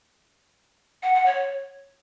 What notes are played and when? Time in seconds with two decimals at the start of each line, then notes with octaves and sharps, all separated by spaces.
1.03 F#5
1.14 F#5
1.26 C#5